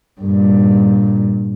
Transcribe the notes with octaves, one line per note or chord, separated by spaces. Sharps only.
G2 A#2